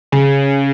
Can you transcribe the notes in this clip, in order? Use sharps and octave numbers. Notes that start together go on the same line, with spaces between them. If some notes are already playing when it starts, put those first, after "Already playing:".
C#3